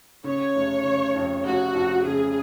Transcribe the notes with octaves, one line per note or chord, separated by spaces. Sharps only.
C#3 C#5
F1
C#3
F2
F1 F#4
F2
C#3 G#4